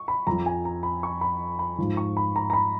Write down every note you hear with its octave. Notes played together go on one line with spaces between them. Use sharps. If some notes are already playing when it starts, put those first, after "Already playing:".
Already playing: C#6
B5
F2 F3 A#5
G#5
A#5
B5
C#6
B5
B5
G#2 F3
C#6
B5
A#5
A#5
B5